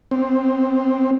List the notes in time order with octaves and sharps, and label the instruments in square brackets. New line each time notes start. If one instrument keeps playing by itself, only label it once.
[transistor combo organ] C4